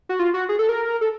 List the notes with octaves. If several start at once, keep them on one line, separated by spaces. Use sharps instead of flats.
F#4
F4
F#4
G#4
A4
A#4
A4